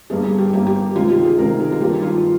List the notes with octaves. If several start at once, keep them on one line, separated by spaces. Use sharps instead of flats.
G1 G2 G3 A#3 G#4
G#4
G4
G1 G2 G3 A#3 G4
G4
C#2 C3 D#3 F4
G4
G#4
C#2 C3 D#3 A#4
G#4
F4
G2 D#3 A#3 G4
F4